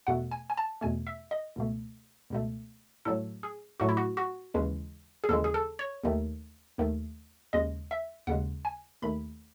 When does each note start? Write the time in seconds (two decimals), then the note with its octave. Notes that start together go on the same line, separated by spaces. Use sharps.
0.07 E2 B2 A3 F#5
0.31 G#5
0.50 G#5
0.57 A5
0.81 E2 B2 A3 G#5
1.07 E5
1.31 D#5
1.56 C#2 B2 A3
2.30 C#2 B2 A3
3.05 A2 F#3 A3 A4
3.43 G#4
3.80 A2 F#3 A3 F#4
3.89 E4
3.97 F#4
4.17 F#4
4.54 D#2 C#3 E3 G#3
5.24 G#4
5.29 D#2 C#3 E3 G#3 A4
5.44 G#4
5.54 A4
5.79 C#5
6.03 D#2 D#3 A3
6.78 D#2 D#3 A3
7.53 D#2 C#3 G#3 D#5
7.91 E5
8.27 D#2 C#3 G#3 F#5
8.65 G#5
9.02 D#2 D#3 A3 B5